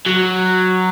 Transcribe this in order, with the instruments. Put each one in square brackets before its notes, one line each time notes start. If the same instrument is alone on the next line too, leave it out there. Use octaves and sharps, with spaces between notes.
[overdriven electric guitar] F#3